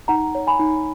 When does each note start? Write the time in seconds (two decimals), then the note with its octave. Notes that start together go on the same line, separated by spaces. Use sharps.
0.08 D#4 F#5 A#5
0.35 C#5
0.47 G#5 B5
0.59 D#4